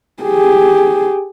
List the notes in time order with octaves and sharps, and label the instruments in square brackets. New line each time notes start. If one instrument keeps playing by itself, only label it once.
[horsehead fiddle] G4 G#4